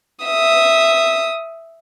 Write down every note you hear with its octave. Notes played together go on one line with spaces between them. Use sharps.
E5 D#6